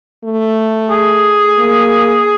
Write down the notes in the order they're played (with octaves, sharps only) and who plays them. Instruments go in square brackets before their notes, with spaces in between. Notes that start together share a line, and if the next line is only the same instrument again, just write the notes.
[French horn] A3
[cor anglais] G#4
[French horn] A#3